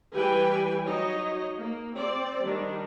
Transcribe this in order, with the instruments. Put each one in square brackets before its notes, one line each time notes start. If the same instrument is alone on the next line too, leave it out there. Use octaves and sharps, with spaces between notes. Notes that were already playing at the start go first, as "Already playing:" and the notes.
[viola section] E3 G3 G4 B4 G5 G#5
F#3 D#4 C#5 D#5
A#3
C4 D5
D#3 G3 D4